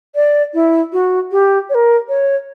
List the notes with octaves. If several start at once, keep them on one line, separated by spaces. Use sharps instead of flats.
D5
E4
F#4
G4
C#5
A#4
C#5